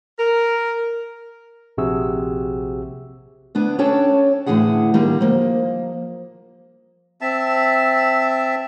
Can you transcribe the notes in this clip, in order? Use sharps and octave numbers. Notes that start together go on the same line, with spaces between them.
A#4
A#1 C3 F#4 G#4 E6
D2 B3 D4
C#4 D4 A4 C#5 G5 A5
A2 D3 E3 D#4 G#4 F#5
D3 D#3 G3 A#3
F3 A#3
C4 E5 A5